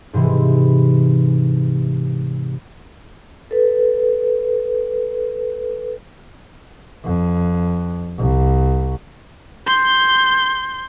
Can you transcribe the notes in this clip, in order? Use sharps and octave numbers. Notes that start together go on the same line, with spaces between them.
G#2 C3 E3 G#3
A4 B4
F2
C2
C6 G6